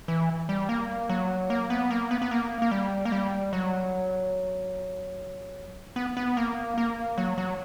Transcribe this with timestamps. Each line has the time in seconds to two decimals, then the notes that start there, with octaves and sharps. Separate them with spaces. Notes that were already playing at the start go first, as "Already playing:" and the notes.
0.08 E3
0.49 G3
0.69 A#3
1.09 F#3
1.50 A#3
1.70 B3
1.91 A#3
2.11 B3
2.22 B3
2.31 A#3
2.62 A#3
2.71 G3
3.05 A#3
3.12 G3
3.53 F#3
5.96 B3
6.17 B3
6.37 A#3
6.78 A#3
7.18 F#3
7.38 F#3